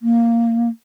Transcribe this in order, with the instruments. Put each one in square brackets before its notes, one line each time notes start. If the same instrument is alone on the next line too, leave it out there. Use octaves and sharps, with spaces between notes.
[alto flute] A#3